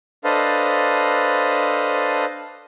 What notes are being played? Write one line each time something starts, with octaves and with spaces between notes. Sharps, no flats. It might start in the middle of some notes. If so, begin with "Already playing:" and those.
D4 A4 B4 C5 D#5 F5